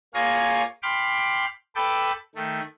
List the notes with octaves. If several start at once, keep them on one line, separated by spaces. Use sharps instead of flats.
A#3 F4 G#4 C#5 F5 A#6
G5 B5 C6 D6 F6
A4 B4 G5 A5 B5 D6
D#3 A3